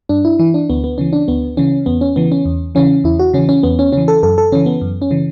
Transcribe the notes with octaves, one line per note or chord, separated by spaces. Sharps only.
G2 D4
E4
E3 E4
D4
D2 B3
B3
C#3 E3 C#4
D4
D2 B3
C#3 E3 C#4
E2 B3
C#4
C#3 E3 B3
C#4
E2
C#3 E3 C#4
E2 E4
F#4
C#3 E3 C#4
C#4
E2 B3
C#4
C#3 E3 C#4
A4
F#2 A4
A4
C#3 E3 C#4
B3
F#2
C#4
C#3 E3